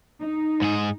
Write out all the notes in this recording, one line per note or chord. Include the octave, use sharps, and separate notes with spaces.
D#4
G#2 G#4